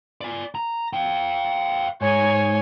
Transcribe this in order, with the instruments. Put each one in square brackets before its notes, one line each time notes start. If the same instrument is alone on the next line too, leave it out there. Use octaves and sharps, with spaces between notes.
[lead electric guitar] D5 G#5
A#5
F5 G5
[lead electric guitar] G#2 [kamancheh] C#5 G#5